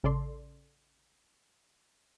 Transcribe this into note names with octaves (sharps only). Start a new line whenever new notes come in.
A1 C#3 A4 D5 C6